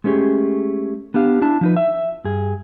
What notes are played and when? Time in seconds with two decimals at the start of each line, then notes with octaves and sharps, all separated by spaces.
0.04 G#3 A3 C#4 G4 G#4
1.14 B3 D4 G4 F5
1.42 D4 E4 A5
1.61 F3 D#4 B4
1.76 E5
2.24 G2 G#4